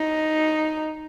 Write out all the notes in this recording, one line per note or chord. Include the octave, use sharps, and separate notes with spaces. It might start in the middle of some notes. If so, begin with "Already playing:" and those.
Already playing: D#4